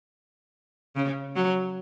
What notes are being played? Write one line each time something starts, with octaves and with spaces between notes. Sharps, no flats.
C#3
F#3